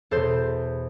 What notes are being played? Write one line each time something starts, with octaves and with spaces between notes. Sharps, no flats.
E2 B2 A4 C5